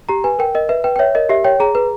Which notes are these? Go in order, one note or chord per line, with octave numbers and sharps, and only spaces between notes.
G4 A#5
B4 G#5
A#4 G5
A#4 D#5
B4 E5
B4 G5
G5
C#5 E5
A#4 D#5
G4 E5
C#5 G5
G#4 A#5
B4